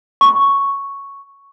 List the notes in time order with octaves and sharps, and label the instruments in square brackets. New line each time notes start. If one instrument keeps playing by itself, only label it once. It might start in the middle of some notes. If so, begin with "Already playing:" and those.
[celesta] C#6